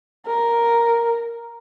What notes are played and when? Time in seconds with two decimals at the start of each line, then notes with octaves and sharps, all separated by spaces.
0.27 A#4